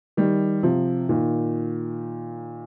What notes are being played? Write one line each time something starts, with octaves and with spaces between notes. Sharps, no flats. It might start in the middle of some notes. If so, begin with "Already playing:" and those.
D#3 G3
C3 F3
A#2 D#3